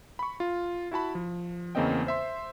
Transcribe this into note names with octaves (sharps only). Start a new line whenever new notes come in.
B5 C#6
F4
E4 F#4 A5 B5
F3
E2 C#3 A#3 C4 D#5 G5
C5 E5 C6